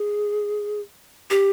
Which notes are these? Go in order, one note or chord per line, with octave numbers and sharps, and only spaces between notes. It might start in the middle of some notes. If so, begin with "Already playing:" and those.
Already playing: G#4
G4